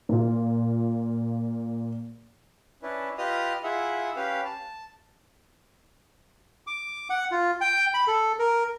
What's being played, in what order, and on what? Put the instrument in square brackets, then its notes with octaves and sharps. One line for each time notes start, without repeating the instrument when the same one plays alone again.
[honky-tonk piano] A#2 F4
[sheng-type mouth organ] C#4 D4 E4 B4
F4 G4 B4 D#5 D#6 F6
E4 F4 G#4 E5 F#5
C#4 G4 B4 F5
A5
[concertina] D6
F#5
F4
G5
B5
A4
A#4